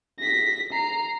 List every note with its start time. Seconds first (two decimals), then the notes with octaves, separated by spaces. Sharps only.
0.19 A#6 B6
0.72 A#5 C7